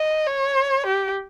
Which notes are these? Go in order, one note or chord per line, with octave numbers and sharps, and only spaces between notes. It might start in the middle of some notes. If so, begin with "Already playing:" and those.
Already playing: D#5
C#5
G4